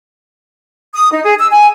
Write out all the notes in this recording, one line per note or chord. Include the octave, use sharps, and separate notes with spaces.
D#6
D#4
G#4
E6
G#5